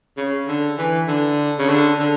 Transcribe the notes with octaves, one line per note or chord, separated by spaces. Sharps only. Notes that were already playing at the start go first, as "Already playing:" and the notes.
C#3
D3
E3
D3
C#3
D3
D3